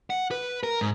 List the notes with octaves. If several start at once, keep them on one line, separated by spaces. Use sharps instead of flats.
F#5
B4
A#4
G#2